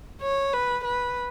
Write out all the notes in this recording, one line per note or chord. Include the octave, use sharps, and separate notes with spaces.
C#5
B4
B4